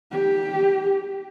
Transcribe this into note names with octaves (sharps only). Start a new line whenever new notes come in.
G4